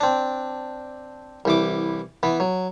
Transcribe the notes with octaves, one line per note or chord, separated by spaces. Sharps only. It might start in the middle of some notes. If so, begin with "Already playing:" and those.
C4 D4
C2 E3 D6
E3 B3
F#3